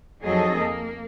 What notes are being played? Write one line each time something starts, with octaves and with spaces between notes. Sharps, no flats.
F2 F#3 D#4 G#4 A4 D#5
A#3